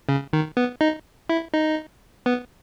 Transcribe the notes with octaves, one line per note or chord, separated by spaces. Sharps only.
C#3
D#3
B3
D#4
E4
D#4
B3